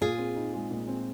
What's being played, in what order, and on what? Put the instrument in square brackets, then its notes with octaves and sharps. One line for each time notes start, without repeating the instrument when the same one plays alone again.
[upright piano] A#2 [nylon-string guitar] F4 G#4
[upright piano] C4
D#4
G#3
A#2
C4